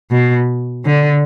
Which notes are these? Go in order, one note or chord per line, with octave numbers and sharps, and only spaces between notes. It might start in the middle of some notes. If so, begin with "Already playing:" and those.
B2
D3